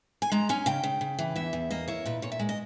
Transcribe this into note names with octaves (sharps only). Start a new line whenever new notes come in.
G#5
G#3 A#5
C#4 G#5
C#3 G5
C#3
C#3
E3
E2 E5
E2
A#3 D#5
E4 C#5
A#2 B4
A#2 C#5
E5
G#3
D#5